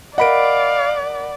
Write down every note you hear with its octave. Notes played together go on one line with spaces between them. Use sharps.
A#4 D5 D#5 F5 F#5 B5 D7